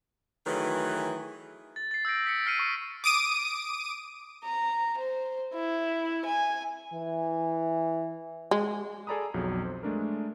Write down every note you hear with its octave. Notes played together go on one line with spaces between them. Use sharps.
D#3 E3 F#3 A3 G#4 B4
A6
A6 C7
E6 G6 A#6 D7
D#6 B6 C#7
E6 F6 A6 C7 C#7 D#7
C#6
D6 D#6 D7 D#7
A#5
C5
E4
G#5
E3
G#3
G#4 A4 D5 A#5 B5 D#6
B1 F2 F#3
C5
G#3 A3 D4 A#4